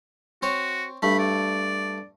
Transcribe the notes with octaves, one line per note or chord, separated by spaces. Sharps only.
C4 F#4 C#5
G2 A3 B5
D5